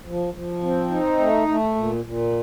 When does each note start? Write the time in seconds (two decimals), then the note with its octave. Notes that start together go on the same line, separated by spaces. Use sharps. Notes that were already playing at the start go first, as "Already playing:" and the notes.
0.06 F3
0.34 F3
0.62 C4
0.91 D#4
1.19 A3
1.48 A3
1.75 A#2
2.04 A#2